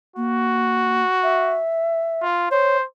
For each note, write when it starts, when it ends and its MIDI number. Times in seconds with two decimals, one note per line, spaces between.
0.17 1.03 58
0.17 1.61 66
1.23 2.23 76
2.22 2.47 65
2.51 2.85 72
2.51 2.77 73